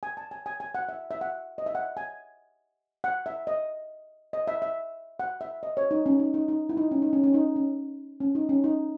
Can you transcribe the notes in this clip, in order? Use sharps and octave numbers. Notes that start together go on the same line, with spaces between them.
G#5
A5
G#5
G#5
G#5
F#5
E5
E5
F#5
D#5
E5
F#5
G#5
F#5
E5
D#5
D#5
E5
E5
F#5
E5
D#5
C#5
D#4
C#4
D#4
D#4
D#4
E4
D#4
C#4
D#4
C#4
C#4
D#4
C#4
C#4
D#4
C#4
D#4